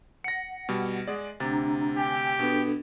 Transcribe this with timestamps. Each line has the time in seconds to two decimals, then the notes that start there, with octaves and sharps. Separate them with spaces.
0.24 F#5 A#6 C#7
0.69 B2 G3
1.07 G#3 G#4 D5
1.40 D2 C3 D4 A#5 A6
1.97 G4 G5 G#5
2.39 B2 B3 D4 A4